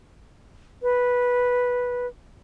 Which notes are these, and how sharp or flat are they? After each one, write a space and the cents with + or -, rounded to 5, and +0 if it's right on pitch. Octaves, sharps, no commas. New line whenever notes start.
B4 -10